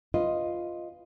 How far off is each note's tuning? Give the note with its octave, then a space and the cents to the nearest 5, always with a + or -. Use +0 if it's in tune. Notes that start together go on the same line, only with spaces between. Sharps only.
F4 +0 B4 +5 D#5 +0